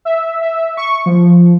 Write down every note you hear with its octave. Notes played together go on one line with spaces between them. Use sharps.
E5
E5
C#6
F3